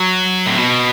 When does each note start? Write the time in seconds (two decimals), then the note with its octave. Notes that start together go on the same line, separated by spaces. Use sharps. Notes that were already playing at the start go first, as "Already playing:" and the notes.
Already playing: F#3
0.47 A2
0.58 B2